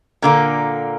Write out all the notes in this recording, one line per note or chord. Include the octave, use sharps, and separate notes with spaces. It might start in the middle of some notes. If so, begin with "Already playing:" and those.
A#2 D3 A#3